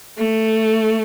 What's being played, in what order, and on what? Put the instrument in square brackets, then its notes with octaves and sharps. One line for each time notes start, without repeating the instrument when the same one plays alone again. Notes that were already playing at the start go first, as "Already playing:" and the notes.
[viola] A3